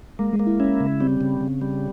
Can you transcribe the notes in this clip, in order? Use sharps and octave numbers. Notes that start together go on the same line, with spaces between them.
G#3 A#3
G#3
A#3
E4
C#4 E4
C#3
G3 C4
C#3
C#3
G3